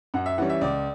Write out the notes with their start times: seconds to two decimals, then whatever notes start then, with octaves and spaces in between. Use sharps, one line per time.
0.14 F#2 F#5
0.26 E5
0.38 E3 G3 C#4 F#5
0.50 E5
0.61 C#2 D5